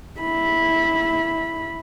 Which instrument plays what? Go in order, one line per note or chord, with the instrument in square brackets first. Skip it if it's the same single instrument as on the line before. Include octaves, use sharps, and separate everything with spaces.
[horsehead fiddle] E4 B5